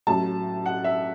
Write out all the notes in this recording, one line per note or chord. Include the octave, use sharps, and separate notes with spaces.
A1 A2 F#3 A5
F#5
E5